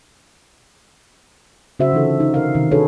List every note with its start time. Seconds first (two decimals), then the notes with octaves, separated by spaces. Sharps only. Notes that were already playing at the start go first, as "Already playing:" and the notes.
1.80 C#3 F#4 C5 E5
1.93 D3 E3 D#4 F4 A4
2.20 D#4
2.34 C3 A#4 F5
2.55 C3 D#3
2.71 D4 F#4 G#4 A4 B4 C#5